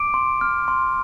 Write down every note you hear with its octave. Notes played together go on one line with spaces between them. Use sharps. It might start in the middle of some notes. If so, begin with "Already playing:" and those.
Already playing: D6 D7
C6
F6
C6